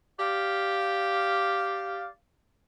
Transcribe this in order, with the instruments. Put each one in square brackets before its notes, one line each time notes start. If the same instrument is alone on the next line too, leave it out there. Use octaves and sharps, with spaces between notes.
[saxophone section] G4 D5 F5